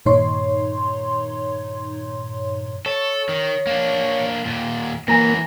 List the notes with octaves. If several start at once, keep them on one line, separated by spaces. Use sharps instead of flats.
G2 A#2 D#3 D#4 C#5 C6
A4 C#5
D#3
A#3 D4
D#2 A#2
E3 F#3 A#3 G#5 A#5 A#6